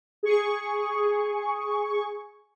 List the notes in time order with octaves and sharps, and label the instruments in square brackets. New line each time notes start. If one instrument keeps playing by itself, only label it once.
[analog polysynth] G#4 C#6